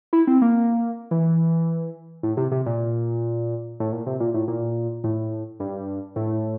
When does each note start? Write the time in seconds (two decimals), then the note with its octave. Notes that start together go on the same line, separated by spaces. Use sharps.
0.13 E4
0.27 C4
0.42 A#3
1.11 E3
2.23 A2
2.37 C3
2.52 C3
2.66 A#2
3.80 A2
3.92 A#2
4.06 C3
4.20 A#2
4.34 A2
4.48 A#2
5.04 A2
5.60 G2
6.16 A2